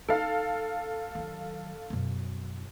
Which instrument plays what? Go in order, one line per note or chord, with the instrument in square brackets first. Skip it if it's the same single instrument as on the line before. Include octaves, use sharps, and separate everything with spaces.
[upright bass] D#4 [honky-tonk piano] A4 F5
[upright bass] D#3 F#3
F#2 B2